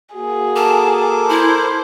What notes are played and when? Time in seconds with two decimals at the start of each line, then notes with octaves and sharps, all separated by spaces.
0.15 A#3 F#4 G#4
0.56 A4 A#4 A5 D6
1.29 E4 C5